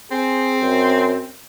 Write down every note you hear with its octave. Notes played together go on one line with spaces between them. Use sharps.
C4 G#4
F#2